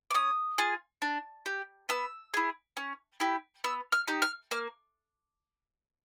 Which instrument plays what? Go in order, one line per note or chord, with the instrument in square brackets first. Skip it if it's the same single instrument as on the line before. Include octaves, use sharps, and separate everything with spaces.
[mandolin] D6
C#4 D#6
F4 G#4
D4
G4
B3 E6
E4 G#4
C#4
E4 G4
B3 E6
F6
D#4 G4
F6
A#3 F6